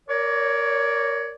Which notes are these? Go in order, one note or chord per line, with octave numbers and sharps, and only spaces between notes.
A#4 C#5 D5